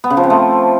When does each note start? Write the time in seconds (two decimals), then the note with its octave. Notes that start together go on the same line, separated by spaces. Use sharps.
0.04 B3
0.10 C#3
0.17 F3
0.24 C4
0.30 A3